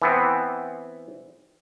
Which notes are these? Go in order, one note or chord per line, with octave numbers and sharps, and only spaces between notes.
E3 B3 C4